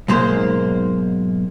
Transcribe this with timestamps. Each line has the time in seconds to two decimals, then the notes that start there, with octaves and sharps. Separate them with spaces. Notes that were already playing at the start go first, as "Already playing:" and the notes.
0.08 B1 G#2 G#3 A#3 C5